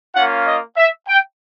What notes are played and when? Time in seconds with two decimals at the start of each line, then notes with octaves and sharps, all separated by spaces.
0.14 A#3 C#4 F4 F#5
0.47 D#5
0.77 E5
1.08 G5